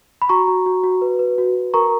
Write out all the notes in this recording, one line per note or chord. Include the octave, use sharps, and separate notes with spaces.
B5
F#4 A#5 C#6
F#4
F#4
F#4
B4
B4
F#4
F#4
A#4 A#5 C#6